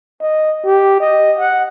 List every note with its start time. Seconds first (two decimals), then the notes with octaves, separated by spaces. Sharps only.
0.21 D#5
0.65 G4
1.00 D#5
1.39 F#5